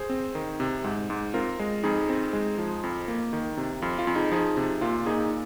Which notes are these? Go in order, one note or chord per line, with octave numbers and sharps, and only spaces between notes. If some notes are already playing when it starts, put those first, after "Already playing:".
Already playing: G#4 C5
C4
D#3
C3
G#2
G#2
C4 F4 A#4
G#3
F2 D#4 G#4
C4
G#3
F3
F2
A#3
D#3
C3
F2 F4
F4
F2
D#4 G#4
F3 D#4 G#4
C3
A#2 F4
A#2 D#4 G#4